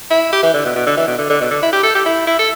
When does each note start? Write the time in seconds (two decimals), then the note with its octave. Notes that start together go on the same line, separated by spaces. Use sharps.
0.10 E4
0.32 G4
0.43 E3
0.54 D3
0.65 B2
0.75 B2
0.86 D3
0.97 E3
1.07 B2
1.18 D3
1.30 D3
1.41 B2
1.51 D3
1.62 E4
1.73 G4
1.83 A4
1.95 G4
2.06 E4
2.27 E4
2.39 A4